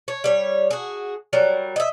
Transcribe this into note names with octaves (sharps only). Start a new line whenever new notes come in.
C#5
G3 C#5
F#4 G#4
F#3 G3 A#4
D#5 E5